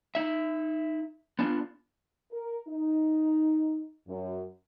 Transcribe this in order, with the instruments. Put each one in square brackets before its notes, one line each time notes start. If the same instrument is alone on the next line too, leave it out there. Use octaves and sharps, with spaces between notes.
[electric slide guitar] D#4 E5
B3 D4 F4
[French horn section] A#4
D#4
F#2